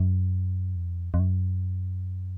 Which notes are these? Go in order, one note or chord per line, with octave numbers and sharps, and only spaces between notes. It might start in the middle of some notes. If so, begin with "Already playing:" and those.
Already playing: F#2
F2
F2
F#2